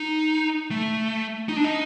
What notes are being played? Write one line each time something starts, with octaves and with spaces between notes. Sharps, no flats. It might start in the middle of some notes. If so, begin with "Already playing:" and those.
Already playing: D#4
A3
D#4
D4
D#4